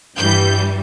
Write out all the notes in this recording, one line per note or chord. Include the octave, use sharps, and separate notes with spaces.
G2 E3 G3 G6